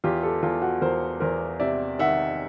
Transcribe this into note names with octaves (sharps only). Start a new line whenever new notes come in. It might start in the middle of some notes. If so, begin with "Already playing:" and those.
E2 F4 G4
G4 A4
E2 F4
F#4
E2 A#4 C5
E2 A#4 C5
C3 D5 E5
D#3 E5 F#5